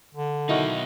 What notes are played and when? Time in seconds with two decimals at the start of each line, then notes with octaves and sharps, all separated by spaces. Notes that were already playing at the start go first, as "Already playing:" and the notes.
0.15 D3
0.49 B1 D#3 D#4 E4 F#4